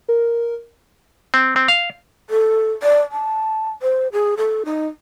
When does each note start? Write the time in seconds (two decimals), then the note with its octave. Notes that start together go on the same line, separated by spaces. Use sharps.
0.09 A#4
1.34 C4
1.56 C4
1.68 F5
2.30 A4
2.83 D5
3.11 A5
3.82 C5
4.13 G#4
4.37 A4
4.65 D#4